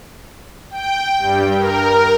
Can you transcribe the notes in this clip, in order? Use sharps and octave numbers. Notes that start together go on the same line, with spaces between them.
G5
G2
A#4